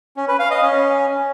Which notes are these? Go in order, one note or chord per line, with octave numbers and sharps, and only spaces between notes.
C#4
B4
F5
D#5
C#4